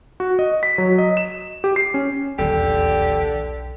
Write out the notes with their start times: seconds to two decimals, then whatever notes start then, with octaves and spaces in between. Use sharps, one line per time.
0.20 F#4
0.39 D#5
0.63 B6
0.78 F#3
0.98 D#5
1.17 E7
1.64 G4
1.76 C7
1.94 C#4
2.39 D#1 B1 E2 D3 G4